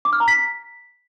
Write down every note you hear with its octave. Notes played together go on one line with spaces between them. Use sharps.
D6
F6
A#5
B6